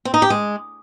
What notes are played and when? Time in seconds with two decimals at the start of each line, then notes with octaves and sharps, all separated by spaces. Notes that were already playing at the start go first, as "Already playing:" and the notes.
0.05 C4
0.14 D#4
0.22 G4
0.30 G#3